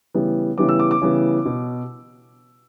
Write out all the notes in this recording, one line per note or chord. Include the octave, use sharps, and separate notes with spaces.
C#3 E3 G3 B3
C#3 E3 G3 B3 D6
E6
D6
D6
C#3 E3 G3 B3
B2